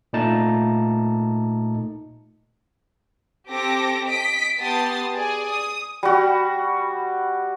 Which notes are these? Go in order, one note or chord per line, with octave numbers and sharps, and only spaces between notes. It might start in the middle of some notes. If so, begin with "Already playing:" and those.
A#2 A3 D#4 A5
C4 G4 A4 D6 A#6
D#5 B6 D7
B3 G4 A5 C6 D#6 A6
G#4 D5 G#5
D#6
G3 F#4